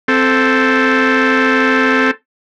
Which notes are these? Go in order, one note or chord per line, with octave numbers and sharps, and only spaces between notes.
C4 A4